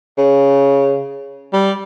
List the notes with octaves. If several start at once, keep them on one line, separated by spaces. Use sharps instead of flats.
C#3
G3